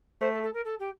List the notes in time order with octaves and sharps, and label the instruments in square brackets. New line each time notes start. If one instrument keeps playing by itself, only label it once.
[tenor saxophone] A3 [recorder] C5
[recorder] A4
A4
A#4
A4
G4